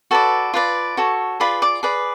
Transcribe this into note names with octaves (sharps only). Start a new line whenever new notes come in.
F#4 A4 B4 D5 A5
F4 B4 D5
F#4 A4 C#5
F4 G#4 B4 D5 B5
D5 D6
G#4 B4 D5